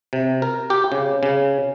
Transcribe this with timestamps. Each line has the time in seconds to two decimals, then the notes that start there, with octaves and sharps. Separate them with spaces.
0.13 C3
0.42 A#4
0.70 G4
0.92 C#3
1.23 C#3